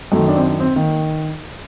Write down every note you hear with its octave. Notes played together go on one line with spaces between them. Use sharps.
F#2 D#3 A3
D4
C4
D4
C4
D#3 A#3